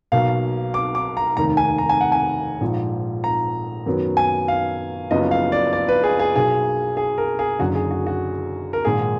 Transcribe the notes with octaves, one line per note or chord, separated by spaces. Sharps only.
B1 B2 A#3 F5
D6
D6
A#5
F1 D#2 D#3 A#5
G#5
A#5
G#5
F#5
G#5
A#1 G#2 F3
A#5
F#2 D#3 F#3 B3
G#5
F5
F#1 F#2 F3 B3 D#5
F5
D5
D5
B4
G#4
G#4
B1 B2 A#3 G#4
G#4
A#4
G#4
F#1 F#2 D3 F#4
G#4
F#4
F#4
A#4
A#1 G#2 D#3 A#3 G#4